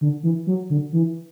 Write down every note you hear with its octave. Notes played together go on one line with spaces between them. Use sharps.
D3
E3
F#3
D3
E3